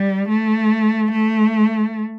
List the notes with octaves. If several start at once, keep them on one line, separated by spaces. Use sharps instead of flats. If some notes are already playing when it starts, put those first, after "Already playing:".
Already playing: G3
A3
A3